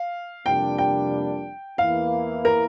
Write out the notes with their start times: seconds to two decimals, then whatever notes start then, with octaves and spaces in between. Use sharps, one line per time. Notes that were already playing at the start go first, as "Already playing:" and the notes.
Already playing: F5
0.46 F2 C3 G3 A#3 D4 G5
0.78 G5
1.78 E2 E3 A#3 E4 F5
2.45 A#4